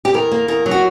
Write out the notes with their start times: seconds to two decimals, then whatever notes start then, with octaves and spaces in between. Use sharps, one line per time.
0.05 G4
0.14 E2 A#4
0.31 A#3
0.48 E2 A#4
0.66 F#3
0.71 F#4